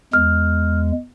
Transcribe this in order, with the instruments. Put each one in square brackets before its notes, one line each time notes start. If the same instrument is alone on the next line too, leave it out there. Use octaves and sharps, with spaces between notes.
[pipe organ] E2 G#3 [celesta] F6